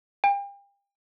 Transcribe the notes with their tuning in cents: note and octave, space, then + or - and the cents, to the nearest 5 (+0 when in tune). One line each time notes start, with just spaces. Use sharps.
G5 +40